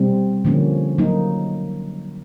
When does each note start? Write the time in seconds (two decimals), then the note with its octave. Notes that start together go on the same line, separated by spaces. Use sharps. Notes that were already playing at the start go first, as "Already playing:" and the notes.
Already playing: B2 G3 C4
0.45 D3 F3 A#3 C#4
0.98 F#3 A#3 D#4